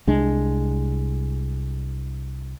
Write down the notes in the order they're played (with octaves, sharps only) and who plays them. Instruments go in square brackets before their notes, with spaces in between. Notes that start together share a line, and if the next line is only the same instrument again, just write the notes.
[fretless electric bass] C2 G#3 D4